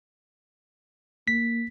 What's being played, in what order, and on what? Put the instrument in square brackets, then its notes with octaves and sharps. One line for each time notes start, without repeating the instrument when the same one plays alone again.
[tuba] A#3 [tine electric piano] B6